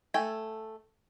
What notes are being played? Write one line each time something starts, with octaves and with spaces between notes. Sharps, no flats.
A3 A4 G5 G#5